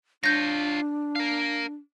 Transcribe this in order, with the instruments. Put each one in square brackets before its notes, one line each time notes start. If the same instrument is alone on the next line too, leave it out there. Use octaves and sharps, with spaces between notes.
[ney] D4 [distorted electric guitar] F4 C#5 [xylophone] G6 A#6
[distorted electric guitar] A#4 F5